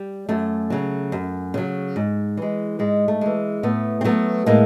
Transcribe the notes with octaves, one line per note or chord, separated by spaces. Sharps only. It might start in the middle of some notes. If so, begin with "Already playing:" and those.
Already playing: G3
F#2 A3
C#3 F#3
F#2
C#3 F#3
G#2
E3 G#3
G#2 G#3
A3
E3 G#3
A2 A3 B3
C4
F#3 A3 B3
A2 G#3 A#3